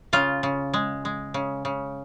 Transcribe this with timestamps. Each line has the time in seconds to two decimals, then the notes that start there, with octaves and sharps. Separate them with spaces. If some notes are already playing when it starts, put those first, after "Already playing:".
0.13 C#3 F4
0.43 C#3
0.74 G#3
1.05 G#3
1.34 C#3
1.65 C#3